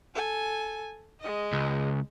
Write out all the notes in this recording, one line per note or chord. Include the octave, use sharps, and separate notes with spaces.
A4 G#5
G#3 D#5
C#2